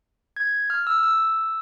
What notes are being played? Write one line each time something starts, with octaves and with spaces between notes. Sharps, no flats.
G#6
F6
E6
E6